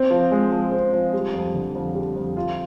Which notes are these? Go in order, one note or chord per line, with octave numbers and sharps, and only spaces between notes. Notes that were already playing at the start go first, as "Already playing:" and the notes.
Already playing: C4
F3
G#3
F3
C4
F3
G3
F2
D3
F2
G3
F2
F4